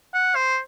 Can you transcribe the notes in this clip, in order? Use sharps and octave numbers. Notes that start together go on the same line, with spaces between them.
F#5
C5